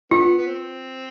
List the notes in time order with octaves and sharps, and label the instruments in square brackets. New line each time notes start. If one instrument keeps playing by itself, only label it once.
[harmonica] D3 B3 [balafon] F4
[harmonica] B3
C4